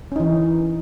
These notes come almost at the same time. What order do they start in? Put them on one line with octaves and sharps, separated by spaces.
C#4 D#4 E3